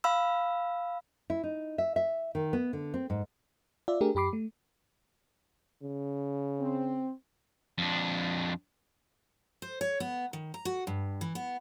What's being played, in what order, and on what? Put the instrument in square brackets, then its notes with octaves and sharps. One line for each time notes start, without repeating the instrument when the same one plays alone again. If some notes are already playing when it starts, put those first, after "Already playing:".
[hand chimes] F5 B5 E6
[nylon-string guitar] E4
D#4
E5
E5
D#3
B3
D3
C4
G#2
[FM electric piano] F4 D5 E5
A3 D4 G4 G#4 A#4
F#2 G4 B5 D6 C7
A3
[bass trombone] C#3
[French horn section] C4
[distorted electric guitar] F2 D4
[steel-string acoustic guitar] C5
C#5
B3
D#3
A#5
F#4
G2
E3
B3